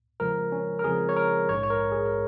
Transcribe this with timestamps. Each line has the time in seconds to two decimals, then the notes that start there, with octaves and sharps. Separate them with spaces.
0.20 F2 C#3 F3 G#3 A#4
0.52 C#4
0.79 A#4
0.84 F2 C#3 F3 G#3 G#4
1.09 C#5
1.16 A#4
1.48 A#1 G#2 G#3 C#5
1.64 C#5
1.70 A#4
1.92 G#4
2.05 A#4